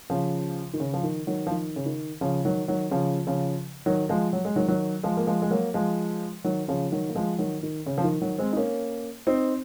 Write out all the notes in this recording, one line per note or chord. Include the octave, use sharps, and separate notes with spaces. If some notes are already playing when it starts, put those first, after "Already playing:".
C#3 F3
D#3
C#3
F3
D#3
D#3 F#3
F3
D#3
C#3
D#3
C#3 F3
D#3 F#3
D#3 F#3
C#3 F3
C#3 F3
D#3 F#3
F3 G#3
F#3
G#3
D#3 F#3
D#3 F#3
F3 G#3
A#3
F3 G#3
G#3
F#3 A#3
F3 G#3
D#3 F#3
C#3 F3
D#3 F#3
A#3
F3 G#3
D#3 F#3
D#3
C#3
F3
D#3
D#3 F#3
G#3 C4
D#4
A#3 C#4
C4 D#4